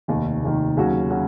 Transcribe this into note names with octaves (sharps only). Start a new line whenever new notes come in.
F1 D#2 D#3
F1 D#2 D#3
D#2 C#3 F#3 C#4 F#4
C#3 F#3 C#4 F#4